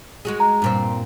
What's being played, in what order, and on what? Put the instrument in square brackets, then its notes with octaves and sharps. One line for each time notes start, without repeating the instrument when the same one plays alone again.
[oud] G#3 F#4 G#4
[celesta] A#5
[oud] G2 A#2 C4